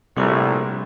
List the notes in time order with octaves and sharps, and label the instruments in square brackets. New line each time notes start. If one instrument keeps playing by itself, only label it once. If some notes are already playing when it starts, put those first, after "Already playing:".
[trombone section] A#1 A2 [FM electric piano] C3 G3